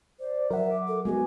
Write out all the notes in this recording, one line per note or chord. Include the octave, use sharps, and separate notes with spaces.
C5 D5
F#3 A#4 E5 F#5
D6
A4
G#3 B3 F#4 G#4 G#5